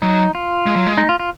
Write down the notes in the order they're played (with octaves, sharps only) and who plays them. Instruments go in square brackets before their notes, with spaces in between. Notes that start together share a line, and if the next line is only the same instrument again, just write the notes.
[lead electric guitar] F#3 [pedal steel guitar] D#4
[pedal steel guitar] F4
[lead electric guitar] G#3
F#3
G#3
[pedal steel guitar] D#4
F4
F4